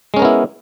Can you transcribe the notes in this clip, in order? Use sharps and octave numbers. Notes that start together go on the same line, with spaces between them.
G#3 B3 C#4 E4 A#4